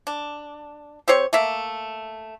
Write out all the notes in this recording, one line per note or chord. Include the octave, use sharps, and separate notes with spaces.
D4
C4 G4 C5 C#5
A3 A#3 E5